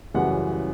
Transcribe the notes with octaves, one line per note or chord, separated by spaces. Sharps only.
F#2 C#3 E3 G3 F#5